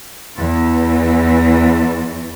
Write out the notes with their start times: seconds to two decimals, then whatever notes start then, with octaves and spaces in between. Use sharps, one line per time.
0.36 E2 E3